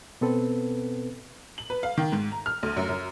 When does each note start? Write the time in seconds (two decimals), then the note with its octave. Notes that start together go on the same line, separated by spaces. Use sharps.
0.21 B2 B3 C4 A4 B4
1.58 F#7
1.70 B4
1.83 F5
1.97 D#3
2.12 G#2
2.32 A#5
2.46 F6
2.63 D2
2.77 F#2
2.89 F#2